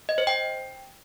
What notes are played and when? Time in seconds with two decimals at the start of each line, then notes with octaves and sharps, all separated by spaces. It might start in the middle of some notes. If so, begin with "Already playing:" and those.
0.09 D#5
0.18 C5
0.27 G5